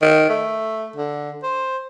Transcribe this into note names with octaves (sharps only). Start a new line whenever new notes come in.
D#3
A3
D3
C5